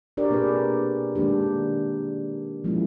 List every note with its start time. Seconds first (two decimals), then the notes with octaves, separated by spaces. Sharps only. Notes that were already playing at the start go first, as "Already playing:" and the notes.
0.17 D4 G4 A#4 C#5 D5
0.30 B2 A#3 C4 G#4 B4
1.15 D#3 G#3 A#3 D4 G4
2.64 F3 G#3 A#3 C#4 E4